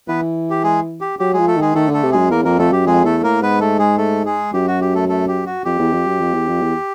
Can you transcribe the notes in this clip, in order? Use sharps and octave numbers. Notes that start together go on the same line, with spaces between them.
E3 B3 B4
G4
G#3 G#4
G4
F#3 G4
G#3 G#4
F3
A3 A4
D#3
G#3 G#4
D#3 A3 A4
D3
A3 A4
C3
F#2 G#3 G#4
E2 A#3 A#4
F2 A#3 A#4
F2 A3 A4
F#2 G4
F2 G#3 G#4
E2 A3 A4
A2 A#3 A#4
G#2 B3 B4
A3 A4
G#3 G#4
A3 A4
G#3 G#4
F#2 G4
F#4
G4
A3 A4
A3 A4
G4
F#4
F2 G4
E2
F2
F#2
F2
E2
F2
E2